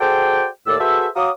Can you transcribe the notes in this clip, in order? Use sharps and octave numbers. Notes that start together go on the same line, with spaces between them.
F#4 G#4 A4 C5 D5 G5
D#2 A2 D5 E6
F#4 G#4 A4 B4 C5 E5
F#4 C#5 F5 A#5 D6 D#6